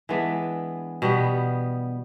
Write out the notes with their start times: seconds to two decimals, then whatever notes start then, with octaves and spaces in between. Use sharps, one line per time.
0.09 E3 G#3 B3 D4
1.02 B2 G3 B3